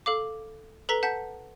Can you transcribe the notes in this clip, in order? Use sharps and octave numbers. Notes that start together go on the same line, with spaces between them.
A4 F5 D6
A4 B4 A#5 B6 G7
F#5 A5 G6 B6